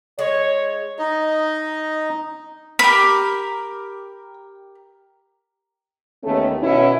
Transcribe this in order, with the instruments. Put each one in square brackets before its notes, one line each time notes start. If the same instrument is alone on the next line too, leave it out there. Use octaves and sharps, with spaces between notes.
[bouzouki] G#3 [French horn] C#5
[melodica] D#4 D#5
[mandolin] G4 A#4 [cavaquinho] B5
[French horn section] D#2 A3 B3 C#4 A4 A#4
B2 C#4 E4